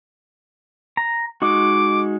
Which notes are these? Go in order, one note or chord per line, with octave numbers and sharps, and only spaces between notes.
A#5
G#3 D#4 F#4 D6